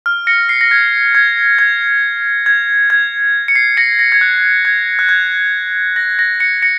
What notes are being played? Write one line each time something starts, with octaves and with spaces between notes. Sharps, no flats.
F6
A#6 C#7
C7
A#6
G#6
G#6
G#6
G#6
G#6
C#7
C7
A#6 C#7
A#6
G#6
F#6
G#6
F#6
G#6
A#6
A#6
A#6 C#7
A#6 C#7